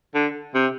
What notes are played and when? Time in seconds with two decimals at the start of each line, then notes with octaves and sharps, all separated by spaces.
0.14 D3
0.54 C3